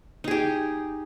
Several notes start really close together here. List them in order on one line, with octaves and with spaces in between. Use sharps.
D#4 G#4 G4